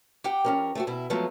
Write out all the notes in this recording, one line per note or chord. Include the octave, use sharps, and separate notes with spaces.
G4 F#5 G5
F2 C#4 A#4
A3 C4 F#4
B2 E4
F3 F#3 G#3 A3 B3